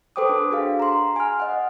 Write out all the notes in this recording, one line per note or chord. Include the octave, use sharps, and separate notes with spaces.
A4 B4 C5 G5 D6 D#6
D4
D4 F#4 G#4 F5
A#5 C6
G#5 F6
D#5 F#5